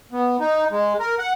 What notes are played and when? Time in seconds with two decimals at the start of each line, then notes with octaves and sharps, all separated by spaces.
0.12 B3
0.40 D#4
0.71 G#3
1.00 A#4
1.19 F#5